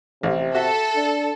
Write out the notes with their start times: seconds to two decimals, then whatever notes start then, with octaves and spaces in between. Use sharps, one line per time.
0.23 A1 C3
0.55 F#4 A4 E5
0.96 D4